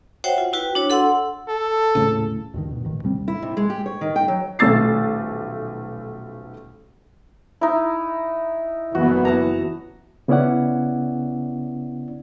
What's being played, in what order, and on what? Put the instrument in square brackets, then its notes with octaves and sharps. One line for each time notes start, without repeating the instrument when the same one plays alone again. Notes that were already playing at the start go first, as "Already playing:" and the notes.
[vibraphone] F#4 C5 C#5 E5 F#5 G5
F4
E4 F#4 B4 G5
D4 F#4 C#5
A4 F#5 C6 E6
[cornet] A4
[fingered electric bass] D#1 A2 C#3
D2 G2 D#3
B2
A1 D#3
D#2 C3 G3 C4
[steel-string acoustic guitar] E4
C3
G#3
G4
C#5
D#3
G5
F#3
[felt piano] D#1 B1 A3 E6 A6 C7
[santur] D#4 E4
[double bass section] F#1 E3 B3 [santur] F#4
[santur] F#5 A5 A#5
[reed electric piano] C#3 B3 C#4 E4 D5 F#5